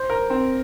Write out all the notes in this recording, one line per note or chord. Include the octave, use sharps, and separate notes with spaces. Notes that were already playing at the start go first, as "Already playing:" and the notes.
Already playing: C5
A#4
C4